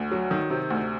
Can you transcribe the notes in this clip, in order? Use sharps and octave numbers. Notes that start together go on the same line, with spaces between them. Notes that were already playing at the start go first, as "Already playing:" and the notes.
Already playing: D2
F#3
D#3
C3
D2